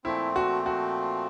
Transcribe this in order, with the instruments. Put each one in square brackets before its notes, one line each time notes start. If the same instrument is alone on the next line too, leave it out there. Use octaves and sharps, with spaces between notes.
[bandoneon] A#2 F3 A3 C4 [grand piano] E4
[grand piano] F#4
F#4